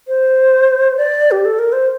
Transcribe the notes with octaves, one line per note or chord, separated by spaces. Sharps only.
C5
D5
G4
A4
A#4
C5